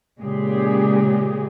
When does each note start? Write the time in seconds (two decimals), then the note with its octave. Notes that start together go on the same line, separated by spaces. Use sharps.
0.19 A#2 C#3 G#3 G4 G#4